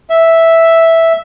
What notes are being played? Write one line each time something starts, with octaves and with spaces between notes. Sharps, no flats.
E5